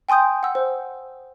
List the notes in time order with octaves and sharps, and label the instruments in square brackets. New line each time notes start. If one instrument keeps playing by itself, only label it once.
[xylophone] G5 G#5 C6 D#6 G6
F#5 E6
C5